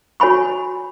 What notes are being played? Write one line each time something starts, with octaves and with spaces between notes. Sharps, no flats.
F#4 C#5 G#5 B5 C#6